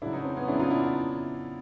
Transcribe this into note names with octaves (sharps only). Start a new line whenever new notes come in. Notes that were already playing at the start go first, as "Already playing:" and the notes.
C#3 F#3 D4 E4
C#4 D#4
C4
B3 C#4
C#3 F#3 D4 E4
D#4 F4
D4 E4